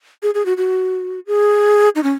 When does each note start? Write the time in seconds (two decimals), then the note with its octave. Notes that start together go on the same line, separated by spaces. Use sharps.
0.23 G#4
0.34 G#4
0.46 F#4
0.57 F#4
1.27 G#4
1.96 D#4
2.03 C#4